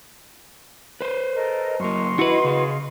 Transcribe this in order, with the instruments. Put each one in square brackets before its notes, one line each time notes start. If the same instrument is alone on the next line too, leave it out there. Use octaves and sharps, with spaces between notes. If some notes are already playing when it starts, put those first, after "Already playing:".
[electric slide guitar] B4 C5
[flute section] A4 A#4 D#5
[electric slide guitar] F#2 A#3 [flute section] D#5 C6 C#6
[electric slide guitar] E4 [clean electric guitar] F#4 B4
[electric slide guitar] C#3 G#4